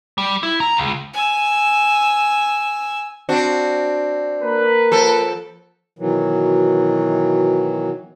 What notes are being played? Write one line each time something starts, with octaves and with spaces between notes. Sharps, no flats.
G3
E4
A#5
C#2
G#5 E6
C4 D4 F#4
A#3 A#4 B4
F3 A4
B2 D#3 E3 F#3